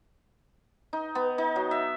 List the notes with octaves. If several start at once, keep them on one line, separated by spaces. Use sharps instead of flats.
D#4
B3
D#4
F#3
E5